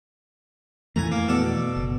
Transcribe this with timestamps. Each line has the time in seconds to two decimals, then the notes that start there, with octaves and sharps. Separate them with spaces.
0.96 F2 E3 A3 G#5 A#5
1.12 A#3
1.28 B2 A4 D5
1.76 F#1